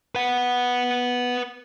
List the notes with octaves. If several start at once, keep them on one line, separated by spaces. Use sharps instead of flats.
B4 F#5